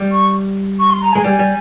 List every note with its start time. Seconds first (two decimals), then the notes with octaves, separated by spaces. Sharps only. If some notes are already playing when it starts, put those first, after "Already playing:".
Already playing: G3
0.12 C#6
0.79 C#6
0.90 C6
1.02 A#5
1.13 G#3 G#5
1.24 G3 G#5
1.39 G3